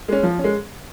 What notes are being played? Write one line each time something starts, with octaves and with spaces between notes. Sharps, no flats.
G#3 C#4
F3
C#4
G#3